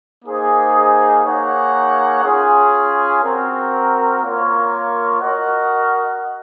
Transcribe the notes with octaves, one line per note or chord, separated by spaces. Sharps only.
A#3 D#4 G#4 C5 D#5
A#3 D#4 G#4 C#5 F#5
C#4 F4 G#4
C4 F#4 A#4
A#3 F4 A#4 C#5
F#4 A#4 D#5 F#5